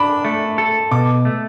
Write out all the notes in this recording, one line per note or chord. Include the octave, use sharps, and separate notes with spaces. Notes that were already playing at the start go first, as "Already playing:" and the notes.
Already playing: D4 B5
A3
A4
B2 D6
A3